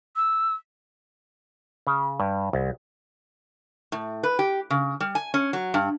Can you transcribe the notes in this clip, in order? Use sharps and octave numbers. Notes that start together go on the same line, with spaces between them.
E6
C#3
G2
C2
A2
B4
G4
C#3
G3
G#5
C#4
F#3
G2